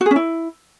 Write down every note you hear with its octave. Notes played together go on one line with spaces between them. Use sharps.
F#4
G#4
C#4
E4